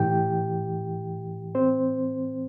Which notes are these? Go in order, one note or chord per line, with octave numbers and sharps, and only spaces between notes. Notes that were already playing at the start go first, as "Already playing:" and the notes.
Already playing: A2 E3 G4 G5
C4 C5